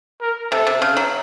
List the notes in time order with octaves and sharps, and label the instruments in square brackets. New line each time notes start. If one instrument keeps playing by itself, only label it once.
[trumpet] A#4
[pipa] C3 [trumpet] A4
[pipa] C3
C#3
F#3